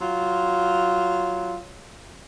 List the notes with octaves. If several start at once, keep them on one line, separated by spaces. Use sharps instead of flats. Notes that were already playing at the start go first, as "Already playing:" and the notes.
F#3 F4